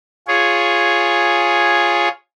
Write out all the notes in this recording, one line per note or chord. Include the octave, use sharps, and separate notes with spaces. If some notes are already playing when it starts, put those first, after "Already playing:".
F4 G#4 C#5